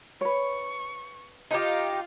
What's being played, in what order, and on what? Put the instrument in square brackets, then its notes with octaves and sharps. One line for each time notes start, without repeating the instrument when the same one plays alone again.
[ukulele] B4 C#5 [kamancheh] C#6
[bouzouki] D#4 G4 [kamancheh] F4 F5